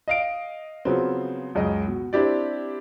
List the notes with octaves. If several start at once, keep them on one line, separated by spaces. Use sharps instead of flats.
D#5 F5 D7
C#3 F3 F#3 B3 C4
C#2 F#2 C#3 D#5
B2
C4 D4 E4 G4 D5